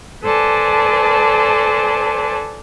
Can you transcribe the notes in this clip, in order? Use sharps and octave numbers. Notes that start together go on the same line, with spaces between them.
A4 B4 C5 D5 G#5 A5